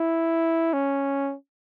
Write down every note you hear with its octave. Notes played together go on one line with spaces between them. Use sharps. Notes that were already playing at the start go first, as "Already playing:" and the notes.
Already playing: E4
C#4